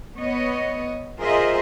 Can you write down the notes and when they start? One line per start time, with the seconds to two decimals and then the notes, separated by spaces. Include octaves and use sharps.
0.16 B3 C#5 D#5
1.20 F4 G#4 A#4 C5 D#5 E5